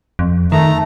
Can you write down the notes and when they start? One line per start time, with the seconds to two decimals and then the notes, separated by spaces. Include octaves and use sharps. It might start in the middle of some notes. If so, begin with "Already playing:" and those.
0.19 F2
0.52 D#3 A3 A#5